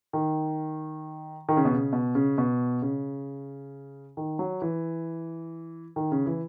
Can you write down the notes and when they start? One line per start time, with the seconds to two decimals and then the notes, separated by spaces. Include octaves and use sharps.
0.13 D#3
1.49 D#3
1.57 C#3
1.65 B2
1.73 C#3
1.93 B2
2.15 C#3
2.38 B2
2.82 C#3
4.17 D#3
4.39 F#3
4.62 E3
5.96 D#3
6.12 C#3
6.26 E3